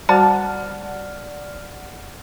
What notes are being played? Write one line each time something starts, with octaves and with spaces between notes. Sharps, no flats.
G3 F#4 C5 D5 F#5 A5 F6